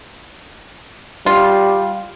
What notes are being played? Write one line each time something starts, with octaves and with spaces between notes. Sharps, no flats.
G3 F4